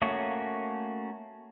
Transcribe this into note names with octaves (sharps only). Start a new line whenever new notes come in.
A3 A#3 C#4 F#4 C#5